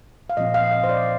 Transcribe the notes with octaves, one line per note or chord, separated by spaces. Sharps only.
F5
A#2 F3 C4 D#5
F5
D#5
C5
D5